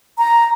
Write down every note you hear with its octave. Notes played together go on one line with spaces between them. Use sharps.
A#5